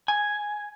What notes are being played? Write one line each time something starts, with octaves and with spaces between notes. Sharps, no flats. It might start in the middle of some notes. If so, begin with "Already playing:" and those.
G#5